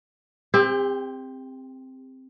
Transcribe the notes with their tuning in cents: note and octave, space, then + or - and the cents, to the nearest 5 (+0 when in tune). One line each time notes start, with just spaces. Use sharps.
C4 +0 G4 +40